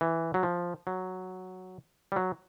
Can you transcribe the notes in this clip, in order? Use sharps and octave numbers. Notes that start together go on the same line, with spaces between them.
E3
F#3
F3
F#3
G3
F#3